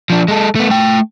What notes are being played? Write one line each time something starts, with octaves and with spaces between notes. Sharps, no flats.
F3 D4
G#3 A4
A3 B3
A3 G5